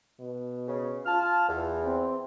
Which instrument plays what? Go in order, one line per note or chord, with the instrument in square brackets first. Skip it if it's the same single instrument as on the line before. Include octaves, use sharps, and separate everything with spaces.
[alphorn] B2
[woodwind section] C#3
[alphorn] F4 [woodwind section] A5 F6
[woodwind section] E2
[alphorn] C4